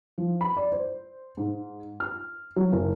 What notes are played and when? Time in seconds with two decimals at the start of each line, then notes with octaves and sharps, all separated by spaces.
0.18 F3
0.41 B5
0.57 D5
0.72 C5
1.37 G#2
2.00 F6
2.56 F#3
2.72 F#1